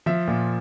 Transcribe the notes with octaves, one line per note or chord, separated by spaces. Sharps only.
F3 E5
A#2